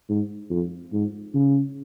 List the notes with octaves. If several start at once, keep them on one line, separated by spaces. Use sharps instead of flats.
G#2
F2
G#2
C#3